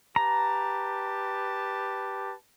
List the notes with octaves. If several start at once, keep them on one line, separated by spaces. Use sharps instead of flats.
G4 B4 A5 A#5